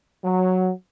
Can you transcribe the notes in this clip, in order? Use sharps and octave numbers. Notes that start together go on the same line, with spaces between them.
F#3